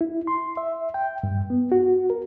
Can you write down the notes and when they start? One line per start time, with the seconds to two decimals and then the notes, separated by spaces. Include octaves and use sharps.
0.01 E4
0.27 C6
0.57 E5
0.94 G5
1.23 G2
1.50 B3
1.72 F#4
2.10 A#4